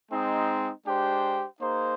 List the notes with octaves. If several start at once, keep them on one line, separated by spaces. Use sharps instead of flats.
G#3 C4 D#4
G#3 D4 G4 C5 G5
A#3 D#4 G#4 C5